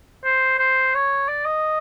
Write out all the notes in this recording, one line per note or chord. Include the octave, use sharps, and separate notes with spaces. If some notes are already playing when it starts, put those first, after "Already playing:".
C5
C5
C#5
D5
D#5